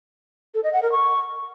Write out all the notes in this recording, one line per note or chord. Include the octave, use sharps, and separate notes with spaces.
A4
D#5
F#5
A#4
C#6